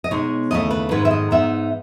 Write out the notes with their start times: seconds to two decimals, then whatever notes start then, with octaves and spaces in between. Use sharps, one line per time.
0.04 D#5
0.11 B2 G#3 D#4 C#5
0.51 D#2 C#3 E3 A3 D#5
0.71 B4
0.91 G#2 D#3 G#3 D#4 B4
1.05 E5
1.11 D#5
1.31 G#2 E3 B3 D#4 E5